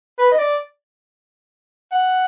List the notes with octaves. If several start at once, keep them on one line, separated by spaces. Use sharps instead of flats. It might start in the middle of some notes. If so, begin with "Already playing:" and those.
B4
D#5
D5
F#5